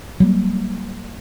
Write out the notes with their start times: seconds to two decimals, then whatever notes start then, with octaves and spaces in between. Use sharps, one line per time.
0.20 F#3 G3 A#3